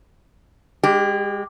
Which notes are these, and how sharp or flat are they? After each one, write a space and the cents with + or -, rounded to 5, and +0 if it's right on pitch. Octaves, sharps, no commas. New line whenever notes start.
G#3 -35 G4 +0